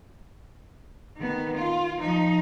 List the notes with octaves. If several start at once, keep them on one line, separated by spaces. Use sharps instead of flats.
D#3 B3
F4
F3 D#4